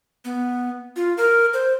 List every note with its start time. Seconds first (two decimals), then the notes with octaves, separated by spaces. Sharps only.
0.25 B3
0.96 F4
1.18 A#4
1.53 C5